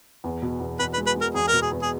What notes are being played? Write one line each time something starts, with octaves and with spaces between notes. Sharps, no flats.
E2
B2
E2
E2 B4
B4
G#3
B4
G#3
A#4
E2 G#4
A#4
B2
G#4
E2
G#4